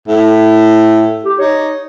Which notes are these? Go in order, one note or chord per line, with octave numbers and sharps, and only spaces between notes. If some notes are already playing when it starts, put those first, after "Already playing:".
A2 E5
G4
D#4 C#5